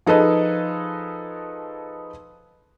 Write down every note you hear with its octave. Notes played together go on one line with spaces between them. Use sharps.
F3 D#4 G#4 A4 B4 D#5